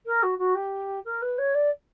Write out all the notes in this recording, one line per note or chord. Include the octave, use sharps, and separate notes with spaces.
A#4
F#4
F#4
G4
A#4
B4
C#5
D5